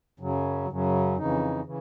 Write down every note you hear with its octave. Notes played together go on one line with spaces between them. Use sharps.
F#2 C#3 F#3
F#2 C#3 F#3
F2 C#3 E3 D#4
C#3 E3